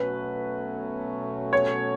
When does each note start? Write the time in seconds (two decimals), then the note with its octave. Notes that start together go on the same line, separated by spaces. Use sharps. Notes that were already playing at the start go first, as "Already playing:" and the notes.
Already playing: B2 F#3 A3 C#4 B4
1.53 C#5